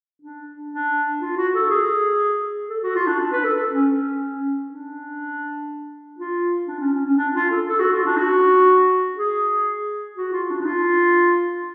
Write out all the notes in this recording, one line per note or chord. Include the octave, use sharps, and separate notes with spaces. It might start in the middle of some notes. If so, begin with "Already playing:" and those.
D4
D4
F4
F#4
A4
G#4
A4
F#4
F4
D4
D4
B4
A4
C#4
D4
F4
D4
C#4
C#4
C#4
D4
F4
A4
A4
F#4
F4
D4
F#4
G#4
F#4
F4
D4
D4
F4